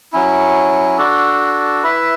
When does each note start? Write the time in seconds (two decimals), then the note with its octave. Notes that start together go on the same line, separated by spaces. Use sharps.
0.13 F#3 C#4 E4
0.98 D4 F#4 A4
1.83 E4 B4 E5